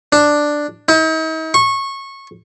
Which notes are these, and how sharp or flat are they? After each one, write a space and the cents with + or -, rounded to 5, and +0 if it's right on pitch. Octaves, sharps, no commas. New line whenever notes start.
D4 +5
D#4 +45
C#6 -20